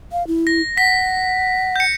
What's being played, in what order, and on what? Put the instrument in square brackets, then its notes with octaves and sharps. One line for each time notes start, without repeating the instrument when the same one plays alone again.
[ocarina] F5
E4
[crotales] A#6
[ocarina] F#5 [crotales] B6
[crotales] G6 C#7